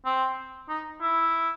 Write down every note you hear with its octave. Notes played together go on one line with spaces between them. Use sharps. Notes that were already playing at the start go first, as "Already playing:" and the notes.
C4
D#4
E4